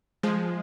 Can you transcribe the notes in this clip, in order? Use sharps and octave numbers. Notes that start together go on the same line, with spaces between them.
F3 G#3